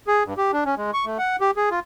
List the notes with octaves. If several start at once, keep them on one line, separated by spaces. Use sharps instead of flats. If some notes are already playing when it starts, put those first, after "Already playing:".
G#4
G2
G4
D4
C#4
G#3
C#6
A3
F#5
G4
G#4
F4